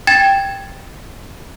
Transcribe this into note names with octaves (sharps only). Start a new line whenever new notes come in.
G5 G#6 A6 E7